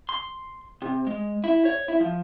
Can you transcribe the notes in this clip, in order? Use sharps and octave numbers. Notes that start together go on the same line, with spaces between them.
C6
C3
G#3
E4
C#5
E4
F3